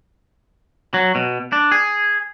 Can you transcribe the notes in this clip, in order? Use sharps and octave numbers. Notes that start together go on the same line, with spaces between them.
F#3
B2
D4
G#4